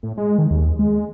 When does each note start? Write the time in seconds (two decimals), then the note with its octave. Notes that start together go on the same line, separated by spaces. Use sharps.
0.03 A2
0.18 G#3
0.38 D#3
0.51 D#2
0.79 G#3